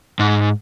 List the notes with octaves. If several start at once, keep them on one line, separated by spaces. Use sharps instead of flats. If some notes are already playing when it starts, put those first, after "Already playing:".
G#2